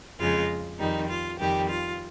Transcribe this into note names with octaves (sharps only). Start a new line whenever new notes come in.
F2 C#3 G#3 F4
F2 D#3 G3 D#4
F4
F2 D#3 G3 G4
F4